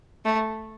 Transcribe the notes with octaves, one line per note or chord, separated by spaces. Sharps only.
A3